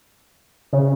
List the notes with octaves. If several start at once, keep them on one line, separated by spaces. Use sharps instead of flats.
C#3